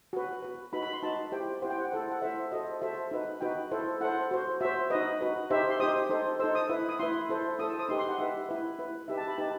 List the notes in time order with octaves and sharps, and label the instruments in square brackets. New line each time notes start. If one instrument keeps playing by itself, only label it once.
[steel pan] F#4 B4
F#4 B4
D#4 F#4 B4 B5
B5
C6
D#4 F#4 B4 A5
E4 G4 C5 G5
E4 G4 C5 F#5
G5
F#5
E4 A4 C5
F#5
E4 A4 C5 E5
F#4 A4 C5 D#5
F#4 A4 C5 E5
D#4 F#4 B4
D#4 F#4 B4 G5
E4 A4 C5
E4 A4 C5 F#5
F#4 C5
F#4 C5 E5
D#4 F#4 B4 D#5
D#4 F#4 B4
D#4 G4 C5 E5
C6
D#4 G4 C5 D#6
D#4 A4 C5
D#4 A4 C5 E6
D#6
E4 B4
D#6
E4 B4 C6
E4 A4 C5
E4 A4 C5 D#6
E6
D#6
D#4 G4 B4 C6
C6
F#5
D#4 G4 B4 E5
E4 B4
E4 B4
D#4 G4 B4 E5
A5
B5
D#4 G4 B4 A5